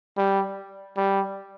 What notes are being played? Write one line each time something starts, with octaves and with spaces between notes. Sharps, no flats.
G3
G3